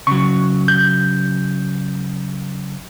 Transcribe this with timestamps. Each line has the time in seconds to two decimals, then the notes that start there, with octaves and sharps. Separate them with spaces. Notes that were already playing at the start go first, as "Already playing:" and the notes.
0.07 C#3 F#3 C#6
0.68 G6